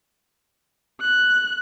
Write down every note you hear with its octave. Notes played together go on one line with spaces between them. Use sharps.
F#6